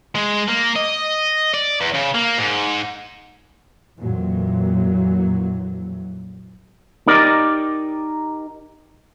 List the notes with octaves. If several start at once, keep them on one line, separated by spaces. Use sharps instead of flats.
G#3
A#3
D#5
D5
E2
C#3
A#3
G#2
F2 A#2 E3 F#3
D#4 G4 A#4 D5